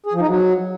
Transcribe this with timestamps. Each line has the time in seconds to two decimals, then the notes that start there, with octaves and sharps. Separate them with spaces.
0.06 G#4
0.13 F3
0.21 D#4
0.28 F#3